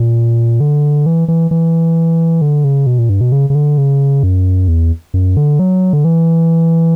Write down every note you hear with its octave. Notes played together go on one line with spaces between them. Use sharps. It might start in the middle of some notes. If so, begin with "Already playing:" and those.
Already playing: A#2
D3
E3
E3
E3
D3
C#3
B2
A#2
G2
B2
C#3
C#3
D3
C#3
F#2
E2
F#2
D3
F#3
D3
E3